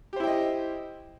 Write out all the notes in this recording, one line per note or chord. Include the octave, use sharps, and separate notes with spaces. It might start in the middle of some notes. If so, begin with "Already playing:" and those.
E4 G4 C5 D#5 G5